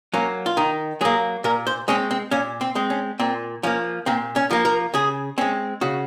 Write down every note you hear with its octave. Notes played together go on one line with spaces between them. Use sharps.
F#3 A#3 C#4
F4
D#3 D#4
F#3 A#3 G#4
A#2 A#4
C5
G#3 C4 C#4
C4
A#2 C#4
C4
G#3 C4
C#4
A#2 C4
F3 A#3 C#4
A#2 C4
C#4
F3 A#3
A#4
C#3 G#4
G#3 C4 C#4
C#3 F#4